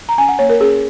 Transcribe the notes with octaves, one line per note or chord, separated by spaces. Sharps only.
A#5
C#4 G#5
F#5
A#3 C#5
A#4
C#4 G#4